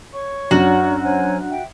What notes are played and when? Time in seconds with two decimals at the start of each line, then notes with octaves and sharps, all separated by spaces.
0.14 C#5 C#6
0.51 F#2 D4 F#4
1.03 C5 C#5 G#5
1.50 E5 G5